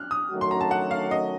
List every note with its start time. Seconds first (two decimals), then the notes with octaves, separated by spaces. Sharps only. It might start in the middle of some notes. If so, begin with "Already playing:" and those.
Already playing: F6 F#6
0.11 D#6
0.30 D#3 F#3 A3 C#4 F#4
0.41 C6
0.51 A#5
0.61 A5
0.71 F#5
0.91 F5
1.11 D#5